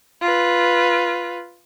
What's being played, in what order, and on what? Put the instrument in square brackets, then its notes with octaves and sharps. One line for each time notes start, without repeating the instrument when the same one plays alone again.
[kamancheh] F4 B4